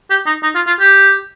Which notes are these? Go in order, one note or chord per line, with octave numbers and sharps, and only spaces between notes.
G4
D#4
D#4
F4
F4
G4